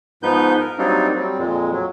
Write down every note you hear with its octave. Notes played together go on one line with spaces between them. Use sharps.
G#2 F3 B3 D#4 B4 G6
A#4
F#3 G3 A#3 C4 D4 D#4
F#3 G3 C4
F2 A#2 G#3
F#3